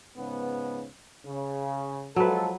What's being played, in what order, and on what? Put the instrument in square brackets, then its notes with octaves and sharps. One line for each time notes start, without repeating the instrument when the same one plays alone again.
[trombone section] G#2 C#3 B3
C#3
[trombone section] F3 G#3 A4 [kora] F#3 B4